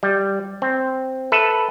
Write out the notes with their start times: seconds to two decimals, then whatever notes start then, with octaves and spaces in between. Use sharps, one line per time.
0.03 G3
0.62 C4
1.32 A4 B4 E5